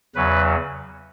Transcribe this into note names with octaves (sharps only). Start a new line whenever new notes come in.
E2 C#3 F#3 B4